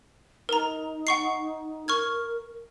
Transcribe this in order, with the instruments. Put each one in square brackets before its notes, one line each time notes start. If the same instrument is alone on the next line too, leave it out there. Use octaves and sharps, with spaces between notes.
[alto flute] D#4 [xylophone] A#4 A#5
[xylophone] F#5 C#6 C7
[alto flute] A#4 [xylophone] C#6 F6 G#6